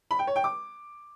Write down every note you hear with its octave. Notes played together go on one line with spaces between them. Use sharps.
B5
G5
C#5
G5
D6